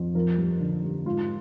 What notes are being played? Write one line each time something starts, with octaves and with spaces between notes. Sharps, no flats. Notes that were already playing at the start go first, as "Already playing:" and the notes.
Already playing: F2
F3 A#4
G2
D3
G2
G#2 F4